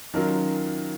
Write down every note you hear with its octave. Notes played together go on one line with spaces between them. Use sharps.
D#3 F#3 C#4 F4 A#4